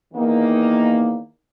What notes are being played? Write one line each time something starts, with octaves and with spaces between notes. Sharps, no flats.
E2 D#3 A#3 D#4